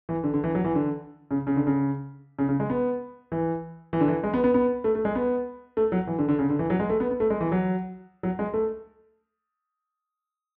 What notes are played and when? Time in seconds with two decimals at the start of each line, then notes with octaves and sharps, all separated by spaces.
0.09 E3
0.24 D3
0.34 D3
0.44 E3
0.55 F#3
0.64 E3
0.75 D3
1.31 C#3
1.47 C#3
1.56 D3
1.67 C#3
2.39 C#3
2.49 C#3
2.60 G#3
2.70 B3
3.32 E3
3.93 E3
4.01 D3
4.08 E3
4.24 G#3
4.34 B3
4.44 B3
4.54 B3
4.84 A3
4.95 A3
5.05 G#3
5.15 B3
5.77 A3
5.92 F#3
6.07 E3
6.18 D3
6.29 D3
6.39 C#3
6.50 D3
6.59 E3
6.70 F#3
6.80 G#3
6.90 A3
7.00 B3
7.11 B3
7.20 A3
7.30 G#3
7.41 E3
7.52 F#3
8.23 F#3
8.39 G#3
8.54 A3